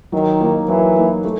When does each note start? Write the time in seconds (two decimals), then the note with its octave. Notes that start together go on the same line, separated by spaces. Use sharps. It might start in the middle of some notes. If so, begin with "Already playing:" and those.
0.12 D#3 F#3
0.41 A#3 D#4
0.68 E3 F#3
0.96 A#3 D#4
1.25 A3